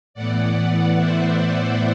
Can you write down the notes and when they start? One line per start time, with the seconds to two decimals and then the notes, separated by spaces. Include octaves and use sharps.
0.14 A2 E3 B3 D5 F#5
0.97 C5 E5